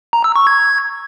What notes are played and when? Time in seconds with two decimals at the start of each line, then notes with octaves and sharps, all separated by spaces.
0.13 A#5
0.24 E6
0.36 C#6
0.47 G#6